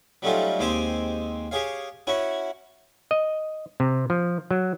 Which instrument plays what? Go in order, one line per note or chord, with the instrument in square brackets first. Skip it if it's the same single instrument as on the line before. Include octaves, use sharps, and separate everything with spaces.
[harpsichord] F#3 G3 A3 C#4 D#4 F4
D#2 G#3 C4 G4 C5 G#5
G4 G#4 C#5 F5
C#4 E4 F#4 C#5
[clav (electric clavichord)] D#5
C3
F3
F#3